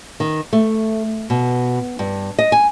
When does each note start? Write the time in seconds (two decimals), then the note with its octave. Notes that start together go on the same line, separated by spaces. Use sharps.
0.20 D#3
0.53 A3
1.30 B2
1.99 G2
2.39 D#5
2.52 G#5